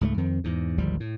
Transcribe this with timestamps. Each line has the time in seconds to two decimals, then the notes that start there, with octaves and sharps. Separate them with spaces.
0.01 C#2 G#2 F3 A3
0.18 F2 D#3 C4
0.44 E2 G#2
0.78 G#1 D2 F3 G3
1.00 A2